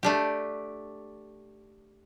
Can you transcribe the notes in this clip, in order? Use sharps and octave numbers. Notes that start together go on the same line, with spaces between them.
A3 D4 G4